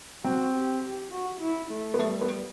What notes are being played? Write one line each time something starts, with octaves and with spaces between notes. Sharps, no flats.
C4 F#4
G4
G4
F#4
E4
A3
B3
G3 A3
B3